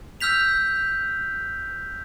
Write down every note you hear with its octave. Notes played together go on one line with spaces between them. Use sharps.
E6 F6 G6 B6 F7